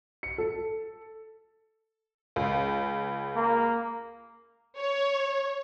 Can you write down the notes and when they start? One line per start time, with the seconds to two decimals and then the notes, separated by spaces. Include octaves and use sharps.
0.23 C#7
0.38 A4
2.36 C#2
3.36 A#3
4.79 C#5